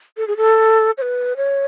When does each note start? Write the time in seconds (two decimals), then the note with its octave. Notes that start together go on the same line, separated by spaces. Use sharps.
0.17 A4
0.28 G#4
0.37 A4
0.98 C#5
1.02 B4
1.37 C#5